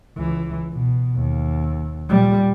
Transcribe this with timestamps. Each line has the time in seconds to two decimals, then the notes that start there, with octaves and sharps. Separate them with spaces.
0.17 C#2 E3
0.73 B2
1.15 D#2
2.09 A#2 G3